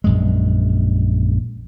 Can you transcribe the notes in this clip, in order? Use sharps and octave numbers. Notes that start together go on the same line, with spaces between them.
A#1 F#2 G#3